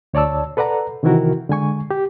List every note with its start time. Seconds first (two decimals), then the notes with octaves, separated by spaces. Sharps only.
0.14 D2 C#5 D5 A5 E6
0.57 A4 B4 D5 F#5 A#5
1.03 C3 D#3 E3 E4 F#4 A#4
1.49 D3 G#3 G#5 C#6
1.91 G4